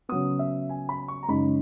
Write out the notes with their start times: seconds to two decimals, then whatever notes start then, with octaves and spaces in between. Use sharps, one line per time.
0.09 C#3 F#3 B3 D#6
0.39 E5
0.69 G#5
0.89 B5
1.08 C#6
1.23 A#5
1.28 F#2 C#3 G#3 D#4 B5